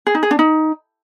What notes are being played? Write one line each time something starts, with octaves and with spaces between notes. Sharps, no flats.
G#4
D#4
G#4
D4
D#4